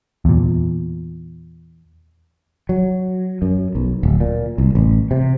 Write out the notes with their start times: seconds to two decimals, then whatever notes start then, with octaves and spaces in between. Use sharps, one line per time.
0.25 E2 A#2
2.69 F#3
3.42 F#2
3.75 B1
4.03 D1
4.20 A#2
4.58 C2
4.75 A1
5.11 C3